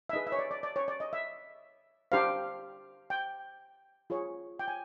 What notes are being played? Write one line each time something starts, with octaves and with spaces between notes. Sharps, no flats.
E5
D#4 G#4 B4 D#5
E5
C#5
D5
D5
D5
C#5
D5
D#5
E5
D4 G4 C5 F5
G5
F4 G#4 C#5
G5
G#5